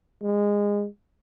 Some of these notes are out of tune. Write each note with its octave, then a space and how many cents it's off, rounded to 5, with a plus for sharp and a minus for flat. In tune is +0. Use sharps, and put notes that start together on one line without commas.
G#3 -20